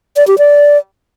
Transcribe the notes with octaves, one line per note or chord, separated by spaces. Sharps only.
D5
G4
D5